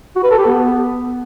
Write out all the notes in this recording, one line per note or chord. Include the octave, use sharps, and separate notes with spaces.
F#4
B4
A4
G4
B3